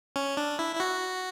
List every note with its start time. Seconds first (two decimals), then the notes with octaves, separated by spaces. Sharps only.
0.16 C#4
0.37 D4
0.59 E4
0.75 E4
0.80 F#4